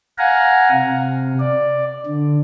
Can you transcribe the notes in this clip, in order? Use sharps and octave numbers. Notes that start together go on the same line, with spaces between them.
F5 F#5 G#5 A#5
C3
D5
D3